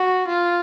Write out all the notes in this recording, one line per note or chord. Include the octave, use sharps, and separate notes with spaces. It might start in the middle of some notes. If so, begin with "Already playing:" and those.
Already playing: F#4
F4